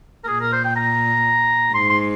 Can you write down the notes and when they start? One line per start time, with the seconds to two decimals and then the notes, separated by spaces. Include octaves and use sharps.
0.24 A#4
0.27 A#2 G#4
0.41 A#4
0.53 C5
0.64 G5
0.76 A#5
1.74 G#2 C6
1.90 C6